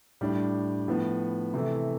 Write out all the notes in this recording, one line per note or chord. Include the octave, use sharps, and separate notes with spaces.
A2 G3 D4
A2 F3 B3
C3 E3 A3